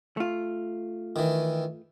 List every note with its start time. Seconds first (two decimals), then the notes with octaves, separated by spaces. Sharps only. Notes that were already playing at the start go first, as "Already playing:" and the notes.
0.17 A3 F4
1.16 D#3 E3